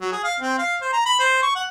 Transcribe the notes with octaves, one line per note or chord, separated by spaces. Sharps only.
F#3
G#4
F5
C4
F5
C5
A#5
B5
C5
C#6
F#5